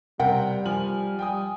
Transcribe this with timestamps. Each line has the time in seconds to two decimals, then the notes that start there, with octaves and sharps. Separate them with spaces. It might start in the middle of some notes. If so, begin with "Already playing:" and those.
0.20 C3 G3 A#4 F#5 G5
0.66 F3 G#5 F6 F#7
1.19 G3 G5 G#5 D#6